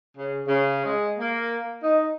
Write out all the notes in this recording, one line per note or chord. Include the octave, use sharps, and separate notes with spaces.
C#3
C#3
G#3
A#3
D#4